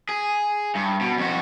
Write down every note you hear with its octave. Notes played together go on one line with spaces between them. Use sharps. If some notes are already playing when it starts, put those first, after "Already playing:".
G#4
G2
B2
F2 F#4